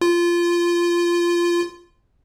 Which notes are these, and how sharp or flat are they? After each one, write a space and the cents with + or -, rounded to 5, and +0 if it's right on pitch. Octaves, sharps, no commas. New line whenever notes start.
F4 -15